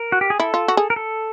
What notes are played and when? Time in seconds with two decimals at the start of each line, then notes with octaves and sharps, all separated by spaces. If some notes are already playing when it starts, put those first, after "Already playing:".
Already playing: A#4
0.12 F#4
0.21 G4
0.30 G#4
0.40 E4 A4
0.54 F4
0.68 F#4
0.77 G#4
0.90 A#4
0.96 A4